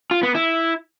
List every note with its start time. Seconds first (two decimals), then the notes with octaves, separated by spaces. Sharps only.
0.11 F4
0.23 B3
0.35 E4